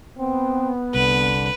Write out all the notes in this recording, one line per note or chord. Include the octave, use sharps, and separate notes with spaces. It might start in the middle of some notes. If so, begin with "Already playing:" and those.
B3 C4
C2 D3 B4